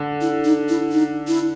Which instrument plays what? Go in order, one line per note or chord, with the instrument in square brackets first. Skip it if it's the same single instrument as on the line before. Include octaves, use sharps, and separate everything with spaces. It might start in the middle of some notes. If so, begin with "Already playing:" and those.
Already playing: [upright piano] D3
[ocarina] E4
D#4
E4
D#4
E4